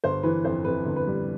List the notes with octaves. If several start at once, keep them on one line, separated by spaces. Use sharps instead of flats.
G1 C5
E3 B4
F2 C5
F2 B4
G1
B4
G3